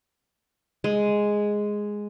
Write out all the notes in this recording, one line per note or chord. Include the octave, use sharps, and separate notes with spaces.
G#3